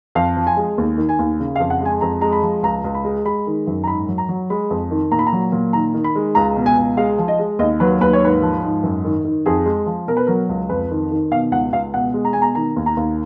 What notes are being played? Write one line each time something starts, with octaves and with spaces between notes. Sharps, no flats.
F2 F5
F3
G#5
G#3
D#2
D#3
G#5
D#2
C#3
F5
F2
F#5
G#3 G#5
F2 A#5
G#3 A#5
B5
F3
C#2 A#5
C#2
B5
G#3
G#3 B5
D#3
F#2
A#5
G#2 B5
F#3
A#5
F#3
G#3 B5
F2
D#3
A#2 A#5
B5
A#5
F#3
A#2
D#3 A#5
D#3
B5
G#3
C#2 A#5
B2
G#5
C#2
G#3 F5
F3
D#5
G#3
D#2 D#5
F#3 B4
D#2 B4
C#5
G#2 B4
F3
G#2
F#2
D#3
D#3
F2 G#4
G#3
F3
B2 A#4
B4
F#3 A#4
C#2
F2 B4
D#3
D#3
B2 F5
C#2 F#5
C#2 F5
B2 F#5
G#3
A#5
B2 G#5
A#5
D#3 A#5
D#2
A#5
D#2